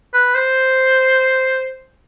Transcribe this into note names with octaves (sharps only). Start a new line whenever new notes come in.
B4
C5